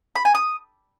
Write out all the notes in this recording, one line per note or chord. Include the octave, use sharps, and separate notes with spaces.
B5
G#5
D#6